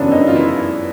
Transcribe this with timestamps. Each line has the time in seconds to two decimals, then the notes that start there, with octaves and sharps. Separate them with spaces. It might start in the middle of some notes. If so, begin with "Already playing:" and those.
Already playing: F#2 C#3 E3 B3 C#4 D4
0.11 F#2 D#4
0.27 E3 F4
0.36 E4